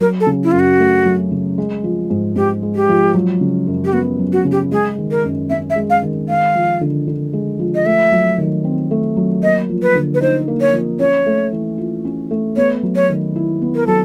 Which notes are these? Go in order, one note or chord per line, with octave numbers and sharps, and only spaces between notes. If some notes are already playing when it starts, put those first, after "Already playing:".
F#3 A#4
A4
C#3
E4
F#2 F4
F#4
A3
F#3
C#3
G#3
F3
G#2
G#2 G4
G#3
G4
F3
F#3
C#3
F#2
G4
B3 F#4
F#3
F#4
C#3
G4
G#3 G#4
D#3
A#4
F#2
C#4 E5
E5
G#3
F5
D#3
G#3 F5
F3
D3
D3
G#3
F3
D#5
A3 E5
F#3
D#3
C4
A3
F#3
A#3 D#5
F3
B4
D3
B4
D#4 C5
A#3
C#5
F3
C#4 C#5
A3
E3
F4
C#4
A3
B3 C#5
F#3
C#5
D#3
E4
B3
A#4
F#3 A4